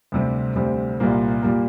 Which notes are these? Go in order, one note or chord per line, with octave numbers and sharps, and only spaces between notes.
D2 C3 G3 C4
D2 C3 G3 C4
C2 A#2 G3 A#3
A#2 G3 A#3